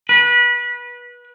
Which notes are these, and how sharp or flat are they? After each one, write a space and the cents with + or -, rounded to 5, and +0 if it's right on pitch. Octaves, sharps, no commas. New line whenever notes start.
B4 -25